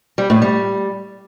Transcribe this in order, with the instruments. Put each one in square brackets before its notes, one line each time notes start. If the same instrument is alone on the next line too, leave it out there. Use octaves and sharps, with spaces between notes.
[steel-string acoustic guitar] G3
A2
G3